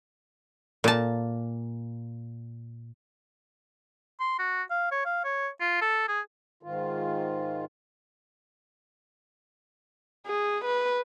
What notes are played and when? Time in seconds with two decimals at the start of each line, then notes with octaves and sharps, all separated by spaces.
0.84 A#2 A5
4.20 C6
4.39 F#4
4.71 F5
4.92 C#5
5.05 F5
5.24 C#5
5.61 F4
5.81 A4
6.08 G#4
6.63 G#2 D#3 F4
10.27 G#4
10.65 B4